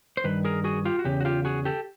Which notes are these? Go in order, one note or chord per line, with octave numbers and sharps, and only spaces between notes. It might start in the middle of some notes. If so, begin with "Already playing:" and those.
C5
G2 D#3 B4
G#4 A#4
F#4 G#4
F4 G4
F#4
E2 C#3 G4
F#4
F4 G4
F#4 G#4
G4 A4